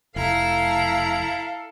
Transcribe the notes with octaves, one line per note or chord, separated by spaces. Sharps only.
F1 E4 A4 F5 A#5